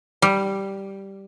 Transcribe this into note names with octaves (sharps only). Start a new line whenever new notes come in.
G3